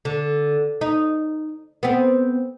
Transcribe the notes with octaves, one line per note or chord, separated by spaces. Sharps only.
D3
D#4
B3 C4